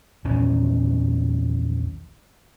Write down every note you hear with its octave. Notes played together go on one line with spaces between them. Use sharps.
A#1 E2 D#3 C#4